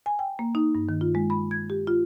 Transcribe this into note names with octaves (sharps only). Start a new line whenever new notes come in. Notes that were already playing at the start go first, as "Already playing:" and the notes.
G#5
G5
A#3
D#4
G2
D#3
F4
G#3
B5
G#6
G4
F4